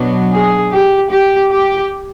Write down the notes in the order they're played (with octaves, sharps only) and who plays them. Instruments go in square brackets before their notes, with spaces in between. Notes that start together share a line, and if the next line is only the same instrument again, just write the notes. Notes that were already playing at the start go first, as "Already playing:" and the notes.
Already playing: [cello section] B2 F#3 B3 D4
G#4
G4
G4
G4